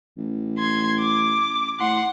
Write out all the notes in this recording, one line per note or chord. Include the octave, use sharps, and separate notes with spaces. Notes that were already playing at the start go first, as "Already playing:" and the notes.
A1
C6 G#6
D6
A2 F#5 C6